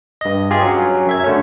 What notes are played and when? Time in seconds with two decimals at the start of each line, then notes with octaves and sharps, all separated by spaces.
0.21 G2 D#5
0.51 F4 G4 G#4
0.62 F#3 C#4
1.07 F#2 E5 G#6
1.24 D3 A3 C#4